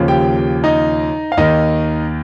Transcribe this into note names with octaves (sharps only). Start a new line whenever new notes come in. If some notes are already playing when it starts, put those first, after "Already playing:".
Already playing: D#2 C#3 F3
G4 G5
D#4 D#5
F5
D#2 D#3 D#4 D#5